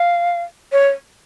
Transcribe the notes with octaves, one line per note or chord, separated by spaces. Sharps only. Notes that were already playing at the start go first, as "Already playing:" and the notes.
Already playing: F5
C#5